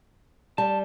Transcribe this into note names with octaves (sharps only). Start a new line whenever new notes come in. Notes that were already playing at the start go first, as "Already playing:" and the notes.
G3 A5